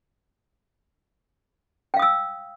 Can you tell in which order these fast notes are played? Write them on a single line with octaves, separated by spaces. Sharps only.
G5 F5 D#6 E6